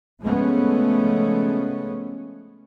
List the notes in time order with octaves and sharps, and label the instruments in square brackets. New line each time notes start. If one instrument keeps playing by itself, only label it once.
[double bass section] C#3 F3 G#3 A3 B3 C#4